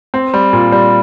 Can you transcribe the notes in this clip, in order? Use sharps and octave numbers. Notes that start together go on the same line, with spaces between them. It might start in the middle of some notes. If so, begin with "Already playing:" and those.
C4
G3
A#2
G3